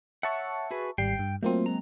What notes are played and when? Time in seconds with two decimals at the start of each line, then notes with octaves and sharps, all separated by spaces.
0.23 C#5 E5 F#5 A5 C#6
0.71 F#4 G#4 B4
0.98 G#1 G3 G5 C7
1.19 G2
1.43 F#3 A3 A#3 C4 F4
1.66 G#3 A#5